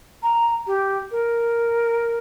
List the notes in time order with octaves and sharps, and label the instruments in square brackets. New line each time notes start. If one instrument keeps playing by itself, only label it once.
[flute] A#5
G4
A#4